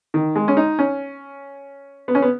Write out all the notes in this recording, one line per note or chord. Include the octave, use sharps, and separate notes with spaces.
D#3
G#3
C#4
D#4
C#4
B3
C#4
B3